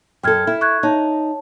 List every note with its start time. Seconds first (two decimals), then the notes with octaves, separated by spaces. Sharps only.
0.23 F#2 A4 G5 F6 G#6
0.47 E4
0.61 C#6 F#6 G#6
0.83 D#4 C#5 A5